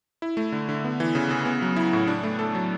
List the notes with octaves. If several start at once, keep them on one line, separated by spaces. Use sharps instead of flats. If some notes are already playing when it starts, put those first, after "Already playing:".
E4
A3
D3
D3
B3
E3
C#3
C#3
B3
F#3
E4
A2
D4
A3
A4
F#3